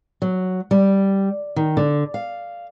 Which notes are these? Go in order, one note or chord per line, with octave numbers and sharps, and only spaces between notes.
F#3
G3
D#3
D3
F5